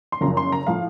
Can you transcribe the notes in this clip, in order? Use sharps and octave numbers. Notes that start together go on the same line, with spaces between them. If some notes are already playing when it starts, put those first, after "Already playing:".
C6
F#1 F#2 C#3 F3 A#5
C6
A#5
A2 F3 F5